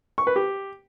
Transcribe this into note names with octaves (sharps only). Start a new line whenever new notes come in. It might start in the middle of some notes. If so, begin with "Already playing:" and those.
C#6
B4
G4